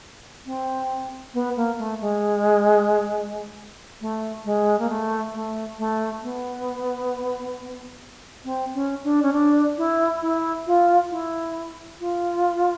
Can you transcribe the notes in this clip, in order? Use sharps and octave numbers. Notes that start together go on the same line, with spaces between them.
C4
B3
A#3
A3
G#3
A3
G#3
A#3
A3
A3
A3
B3
C4
C#4
D4
C#4
D4
E4
E4
F4
E4
F4